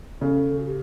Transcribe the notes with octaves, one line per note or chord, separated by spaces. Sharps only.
C#3 A4
F#4
G4